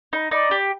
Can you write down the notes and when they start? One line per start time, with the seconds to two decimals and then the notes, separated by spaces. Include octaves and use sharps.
0.13 D#4
0.31 D#4 D5
0.51 G4